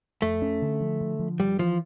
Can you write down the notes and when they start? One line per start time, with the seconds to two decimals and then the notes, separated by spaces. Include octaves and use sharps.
0.22 F2 A3
0.42 C#4
0.62 D3
0.81 F3
1.01 D3
1.19 F3
1.39 G2 G3
1.59 E3 F3